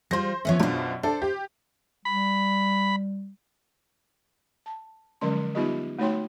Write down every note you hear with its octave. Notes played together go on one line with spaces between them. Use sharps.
G3 F4 C5 A#6
F3 B3 C#4 C#5 E5
F#2 B2 D4 F4 C5
D4 A4 C5
G4
G3 B5
A5
D3 F3 F#3 G#3 C#4 C6
G3 B3 D#4 F4 G4 D#5
A3 D#4 F#4 C#5 G5 C6